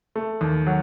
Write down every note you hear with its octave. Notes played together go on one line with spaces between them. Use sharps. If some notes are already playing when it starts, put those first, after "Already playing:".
A3
D#2
F#3